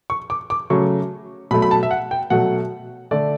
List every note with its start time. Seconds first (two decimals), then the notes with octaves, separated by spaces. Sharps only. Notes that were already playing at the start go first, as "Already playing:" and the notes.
0.10 C#6
0.30 D6
0.50 D6
0.70 C#3 F#3 A3 C#6
1.51 B2 F#3 A3 B5
1.62 B5
1.71 A5
1.83 E5
1.91 F#5
2.11 G5
2.30 B2 F#3 A3 F#5
3.11 D3 A3 D5